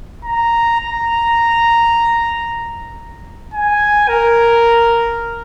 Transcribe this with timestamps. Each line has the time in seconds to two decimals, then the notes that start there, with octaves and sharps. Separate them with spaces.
0.25 A#5
0.80 A#5
3.54 G#5
4.08 A#4